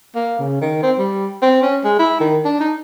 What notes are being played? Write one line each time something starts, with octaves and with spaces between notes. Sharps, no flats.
A#3
C#3
D#3
C4
G3
C4
C#4
G#3
E4
D#3
D4
D#4